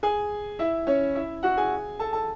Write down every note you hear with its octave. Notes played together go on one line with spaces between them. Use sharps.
G#4 G#5
E4 E5
C#4 C#5
E4 E5
F#4 F#5
G#4 G#5
A4 A5
A4 A5